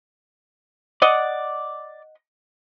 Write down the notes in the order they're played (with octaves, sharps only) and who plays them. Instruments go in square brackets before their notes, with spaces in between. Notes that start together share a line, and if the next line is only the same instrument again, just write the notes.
[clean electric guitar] D5 [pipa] D#5 F#5